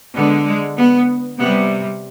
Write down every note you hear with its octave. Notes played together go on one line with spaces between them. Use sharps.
D3 G#3 B3
G#3
B3
C3 G3 B3